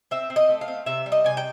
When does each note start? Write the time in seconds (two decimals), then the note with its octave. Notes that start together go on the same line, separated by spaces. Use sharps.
0.11 C4 E5
0.30 C4
0.36 D#5
0.49 A3
0.61 F5
0.68 C4
0.86 C3 E5
1.06 G3
1.12 D#5
1.24 C3 G#5
1.37 G5